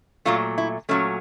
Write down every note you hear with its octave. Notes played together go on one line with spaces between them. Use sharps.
A#2 F#3 A3 F4
E4
A#2 F#3 A3 C#4